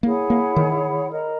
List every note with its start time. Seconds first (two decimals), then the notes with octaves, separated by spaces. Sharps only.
0.03 A#3 E4 G#4 C#5 F#5
0.30 A#3
0.56 D#3
1.10 A#4 D#5 A#5